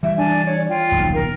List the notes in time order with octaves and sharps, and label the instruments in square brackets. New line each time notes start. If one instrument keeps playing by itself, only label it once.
[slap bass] E3 G3 [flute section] E5
[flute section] D4 G#5
C#5 D5
F4 G5
[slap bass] D#1 B1 F3
[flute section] A#4